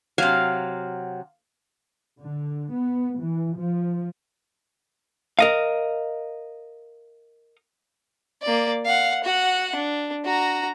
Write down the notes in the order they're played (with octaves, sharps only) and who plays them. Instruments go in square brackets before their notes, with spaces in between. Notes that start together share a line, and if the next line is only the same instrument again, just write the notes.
[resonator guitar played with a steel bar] C3 F#3 [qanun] F5
[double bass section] D3
B3
E3
F3
[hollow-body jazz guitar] A#4 D#5 F5
[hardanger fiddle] A#3 D5
F5 F#5
F#4 F#5
D4
F#4 A#5